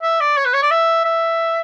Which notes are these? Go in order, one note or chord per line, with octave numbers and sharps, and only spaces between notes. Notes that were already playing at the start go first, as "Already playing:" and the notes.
E5
D5
C#5
B4
C#5
D5
E5
E5